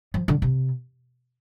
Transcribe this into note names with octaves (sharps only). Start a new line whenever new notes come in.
F3
D3
C3